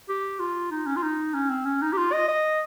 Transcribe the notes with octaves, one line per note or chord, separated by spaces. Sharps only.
G4
F4
D#4
C#4
F4
D#4
C#4
C4
C#4
D#4
G4
F4
D#5
D#5